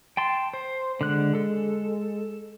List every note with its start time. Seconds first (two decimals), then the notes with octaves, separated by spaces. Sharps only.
0.17 G5 A5 C6
0.53 C5
1.01 D3 G#3 F#6
1.35 A4